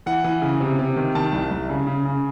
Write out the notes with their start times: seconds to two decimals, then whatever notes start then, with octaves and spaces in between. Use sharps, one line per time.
0.06 E3 F#5
0.24 E3
0.42 C#3
0.61 C3
0.79 C3
0.96 D#3
1.15 D#3 A5
1.33 C2
1.51 C2
1.69 C#3
1.87 C#3
2.05 C#3